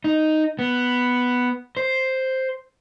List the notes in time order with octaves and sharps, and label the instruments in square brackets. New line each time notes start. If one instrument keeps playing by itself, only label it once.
[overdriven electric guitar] D#4
B3
C5